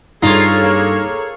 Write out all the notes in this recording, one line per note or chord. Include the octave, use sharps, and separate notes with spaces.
G2 D#4 F4 G#4 A4 C#5 C6
A#3